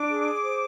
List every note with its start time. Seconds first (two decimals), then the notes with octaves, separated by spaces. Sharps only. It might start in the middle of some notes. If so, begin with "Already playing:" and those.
Already playing: D4 D6
0.08 G#4
0.44 C5